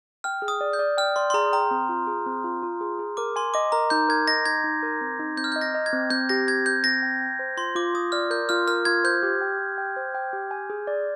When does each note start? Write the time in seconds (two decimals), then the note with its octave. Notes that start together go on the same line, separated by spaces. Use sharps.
0.24 G5 F6
0.42 G#4
0.48 D#6
0.61 D5
0.73 G6
0.79 D5
0.97 G5 F6
1.16 D5 C6
1.30 C6
1.34 G#4 A#5
1.53 G5 A#5
1.71 C4
1.89 F4
2.07 G#4
2.26 C4
2.44 F4
2.63 F4
2.81 G#4
2.99 G#4
3.17 A#4 D6
3.36 G#5 C6
3.54 D#5 D6
3.72 A#4 A#5
3.90 D#4 G6
4.09 A#4 G#6
4.27 D#5 A#6
4.46 D#4 G#6
4.64 D#4
4.83 A#4
5.01 C4
5.19 D#4
5.37 C4 G6
5.44 F6
5.52 D#5 G6
5.61 A#6
5.75 D#5
5.86 G#6
5.93 C4
6.10 C4 G6
6.29 G4 A#6
6.47 C4 G#6
6.66 C4 G6
6.84 C4 A#6
7.02 G5
7.21 G5
7.39 C5
7.57 F4 C6
7.75 F4 D6
7.94 F4 D#6
8.12 D5 F6
8.30 A#4 G6
8.49 F4 F6
8.68 A#4 F6
8.85 F4 G#6
9.04 C5 G6
9.23 G4
9.41 G5
9.59 G4
9.78 G5
9.97 C5
10.15 G5
10.33 G4
10.51 G#5
10.70 G#4
10.87 D5